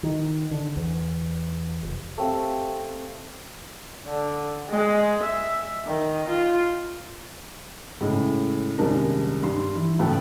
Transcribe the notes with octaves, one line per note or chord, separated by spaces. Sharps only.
D#3
D3
E2
F1
A3 C4 G4 F5
D3
G#3
E5
D#3
F4
A2 C#3 G#3
D#1 C2 F#2 G#3 D4 A#4
G2 C6
E3
C#2 A2 B3 F#4 A4 G5